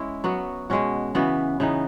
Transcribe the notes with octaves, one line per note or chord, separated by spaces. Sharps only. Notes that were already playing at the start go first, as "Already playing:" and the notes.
Already playing: G#3 C#4 E4
F#3 B3 F#4
B2 G#3 C#4 F#4
C#3 E3 B3 F#4
C#3 E3 B3 D#4